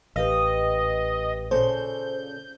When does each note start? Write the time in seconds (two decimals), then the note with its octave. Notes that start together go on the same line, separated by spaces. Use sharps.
0.16 A1 G4 B4 D#5 F5
1.51 A#2 C#3 A4 C5 G6